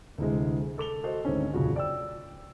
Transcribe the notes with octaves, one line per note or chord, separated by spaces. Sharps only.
D2 C3 E3 G#3
A4 D6 F7 G7
F#4 A4 C5 D#5
D2 G#2 D#3 C4 C#4
D#1 F2 C#3 F3 F#4 C5
D5 G5 E6